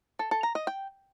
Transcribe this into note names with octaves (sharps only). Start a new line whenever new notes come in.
A4
A4
A#5
D#5
G5